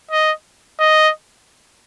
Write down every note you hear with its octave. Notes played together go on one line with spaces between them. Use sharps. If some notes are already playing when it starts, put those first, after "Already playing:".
D#5
D#5